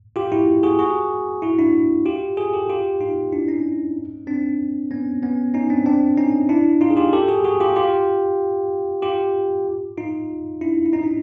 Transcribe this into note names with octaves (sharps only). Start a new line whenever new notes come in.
F4 G4
E4 F#4
F#4 G#4
F#4 G#4
E4 F#4
D4 E4
F4 G4
F#4 G#4
G4 A4
F4 G4
D#4 F4
D4 E4
C#4 D#4
C4 D4
B3 C#4
B3 C#4
C#4 D#4
C4 D4
C4 D4
C#4 D#4
D4 E4
D#4 F4
G#4
F4 G4
G4 A4
F#4 G#4
F#4 G#4
F4 G4
F4 G4
F4 G4
D#4 F4
D4 E4
E4
C#4 D#4
D4 E4